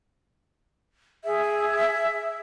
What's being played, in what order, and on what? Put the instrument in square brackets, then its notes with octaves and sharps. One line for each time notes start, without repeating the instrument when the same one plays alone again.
[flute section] G#4 [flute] E5